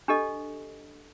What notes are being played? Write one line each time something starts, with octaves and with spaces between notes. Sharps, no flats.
D4 G4 A4 D#5